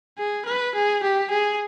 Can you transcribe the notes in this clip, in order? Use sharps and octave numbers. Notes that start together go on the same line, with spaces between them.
G#4
B4
G#4
G4
G#4